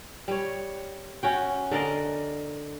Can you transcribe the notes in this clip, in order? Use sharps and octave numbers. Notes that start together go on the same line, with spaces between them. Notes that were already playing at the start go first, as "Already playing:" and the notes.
G3 C#5
C#4 F#4 G5
D3 A#4 D5 D#5